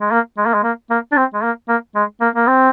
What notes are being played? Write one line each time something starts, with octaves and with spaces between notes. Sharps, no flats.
G#3
A#3
G#3
A#3
G#3
A#3
A#3
D4
C4
G#3
A#3
A#3
G#3
A#3
A#3
C4